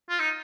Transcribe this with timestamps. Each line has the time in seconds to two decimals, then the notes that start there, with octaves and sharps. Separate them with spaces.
0.09 F4
0.19 D#4